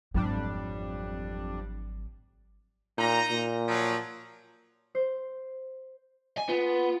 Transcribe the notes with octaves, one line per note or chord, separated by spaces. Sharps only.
G#1 F2 F#3 G3 D4
A#2 D#4 A#5
A#2
F3 F#3
C5
G#5
B3 F4